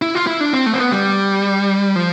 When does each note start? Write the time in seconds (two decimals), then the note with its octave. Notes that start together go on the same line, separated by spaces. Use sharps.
0.02 E4
0.15 F4
0.27 E4
0.40 D4
0.53 C4
0.66 A3
0.74 C4
0.79 B3
0.92 G3
1.96 F3